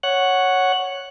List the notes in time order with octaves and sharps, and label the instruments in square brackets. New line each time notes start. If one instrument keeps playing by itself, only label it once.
[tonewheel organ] C#5 F#5 F#6